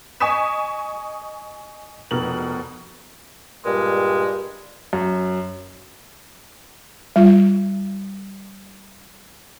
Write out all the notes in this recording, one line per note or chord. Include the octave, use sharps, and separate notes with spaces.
D#5 G#5 C#6 D#6 B6 E7
F1 B2 A#4 F#7
G2 A#2 G3 G#3
F#2
G3 F4